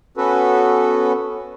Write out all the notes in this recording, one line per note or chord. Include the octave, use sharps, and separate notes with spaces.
B3 C#4 F#4 A4 B4